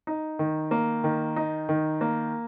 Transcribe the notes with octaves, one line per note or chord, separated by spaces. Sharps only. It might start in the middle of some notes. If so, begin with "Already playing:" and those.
D#4
D#3
A#3
D#3
D#4
D#3
A#3